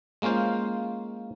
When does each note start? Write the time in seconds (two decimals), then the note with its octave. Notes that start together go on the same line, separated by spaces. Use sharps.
0.22 G#3 A#3 C#4 F4 C5